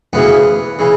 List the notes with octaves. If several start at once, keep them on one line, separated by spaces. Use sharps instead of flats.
D2 C#3 E3 B3
C#3 E3